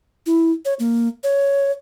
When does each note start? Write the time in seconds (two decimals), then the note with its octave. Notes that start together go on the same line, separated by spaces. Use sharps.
0.26 E4
0.65 C#5
0.80 A#3
1.24 C#5